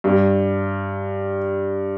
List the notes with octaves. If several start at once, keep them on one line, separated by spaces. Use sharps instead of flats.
G2